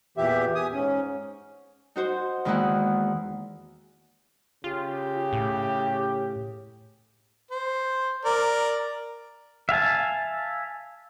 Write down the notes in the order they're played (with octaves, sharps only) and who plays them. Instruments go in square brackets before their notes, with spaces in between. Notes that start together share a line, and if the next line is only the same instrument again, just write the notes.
[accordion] E2 A#2 E3 G4 E5
G#5 D#6
G#2 C#4
[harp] D#4 F#4 C5
E2 D#3 G#3 A#3 E4 F#5
[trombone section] C#3 G4 [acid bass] F4
[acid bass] A2
[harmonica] C5
A#4 D5
[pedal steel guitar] E5 F5 G#5 A5